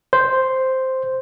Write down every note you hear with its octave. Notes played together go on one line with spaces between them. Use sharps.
C5